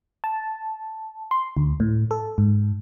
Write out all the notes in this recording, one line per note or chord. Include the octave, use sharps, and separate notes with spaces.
A5
C6
D2
A2
A4
G#2